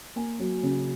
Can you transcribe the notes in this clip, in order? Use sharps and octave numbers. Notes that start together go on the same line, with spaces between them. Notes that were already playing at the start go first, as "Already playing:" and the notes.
A#3 G#5
F#3
C#3